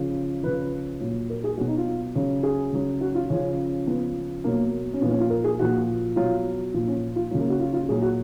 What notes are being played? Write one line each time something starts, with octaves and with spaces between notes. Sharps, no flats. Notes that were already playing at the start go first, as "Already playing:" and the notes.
Already playing: C#3 F3
C#3 F3 B4
A#2 F#3
A#4
G#4
B2 F#3 F#4
D#4
F4
C#3 F#3
G#4
C#3 F#3
F#4
F4
C#3 F3 C#4
C#3 F3 B3
B2 F#3 A#3
C#4
A#2 F3 B3
C#4
F4
A#4
G#4
A#2 F3 F#4
B2 F#3 F4
A#2 F3
C#4
F4
C#3 F#3 F4
A#3
F#4
F4
F4
A#2 F#3 G#4
F#4